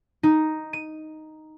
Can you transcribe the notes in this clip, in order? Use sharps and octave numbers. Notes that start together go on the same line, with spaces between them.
D#4
D#7